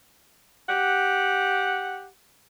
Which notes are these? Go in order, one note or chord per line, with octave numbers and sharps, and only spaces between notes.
G4 F#5